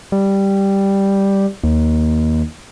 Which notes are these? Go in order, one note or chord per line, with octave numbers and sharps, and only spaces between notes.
G3
D#2